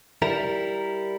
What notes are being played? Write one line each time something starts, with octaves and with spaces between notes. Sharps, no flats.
G3 E4 A#4